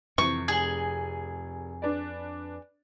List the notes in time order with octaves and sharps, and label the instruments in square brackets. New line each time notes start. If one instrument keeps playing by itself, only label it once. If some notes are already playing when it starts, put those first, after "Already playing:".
[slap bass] F2 [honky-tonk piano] C3 E3 [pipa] C#6
[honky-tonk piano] F1 G#5 F#7 [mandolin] G#4
[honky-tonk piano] D4 B4 D5